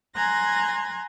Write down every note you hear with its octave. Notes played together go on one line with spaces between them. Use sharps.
G#5 A#5 C6 F#6 G#6 A#6